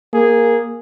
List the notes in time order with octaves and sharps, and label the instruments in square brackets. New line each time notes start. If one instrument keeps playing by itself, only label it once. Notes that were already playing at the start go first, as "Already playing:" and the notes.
[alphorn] A#3 [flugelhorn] G#4